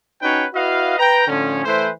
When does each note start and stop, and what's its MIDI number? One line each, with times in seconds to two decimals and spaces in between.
0.22 0.45 61
0.22 0.45 63
0.22 0.45 66
0.22 0.45 71
0.22 0.45 73
0.22 0.45 79
0.54 0.97 64
0.54 0.97 66
0.54 0.97 71
0.54 0.97 75
0.54 0.97 77
0.97 1.24 71
0.97 1.24 79
0.97 1.24 82
1.27 1.62 45
1.27 1.62 50
1.27 1.62 53
1.27 1.62 61
1.64 1.89 52
1.64 1.89 57
1.64 1.89 64
1.64 1.89 71
1.64 1.89 72